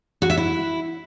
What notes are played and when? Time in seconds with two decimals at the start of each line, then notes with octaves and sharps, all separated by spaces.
0.22 F#4
0.30 E5
0.37 E4